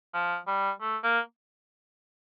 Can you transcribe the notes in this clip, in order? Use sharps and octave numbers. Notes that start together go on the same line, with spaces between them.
F3
G3
A3
A#3